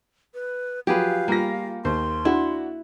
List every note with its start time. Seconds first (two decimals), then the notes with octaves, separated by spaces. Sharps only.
0.34 B4
0.87 F3 F#3 G4 G#4 B4 F5
1.28 G3 A#3 F4 A#6
1.85 D#2 C5 C6
2.25 D4 E4 F#4